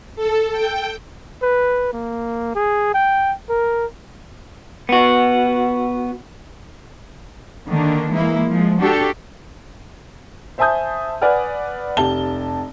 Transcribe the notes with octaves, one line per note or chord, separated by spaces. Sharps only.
A4
G5
B4
A#3
G#4
G5
A#4
B3 F#4
D3 D#3 A#3 D4
E3 G#3 A#3 E4
F3 G#3
D4 F#4 G4 A4
C5 E5 G#5 A5 D#6 G6
B4 D5 F#5 G#5 F6
F1 G4 A5 G7